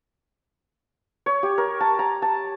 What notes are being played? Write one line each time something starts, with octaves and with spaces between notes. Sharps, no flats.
C#5
G4
A#4
A5
A#5
A5